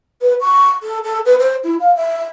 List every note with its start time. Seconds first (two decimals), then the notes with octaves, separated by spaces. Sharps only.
0.21 B4
0.41 C#6
0.83 A4
1.04 A4
1.25 B4
1.40 C5
1.64 E4
1.80 F5
1.96 E5